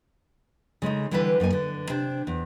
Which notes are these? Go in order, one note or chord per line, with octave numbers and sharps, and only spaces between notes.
C#3 G#3 A3 D#4
D3 E3 G3 E4 A4 B4
F#2 A#3 D#4 G#5
D3 B4
C3 D4 C5
E2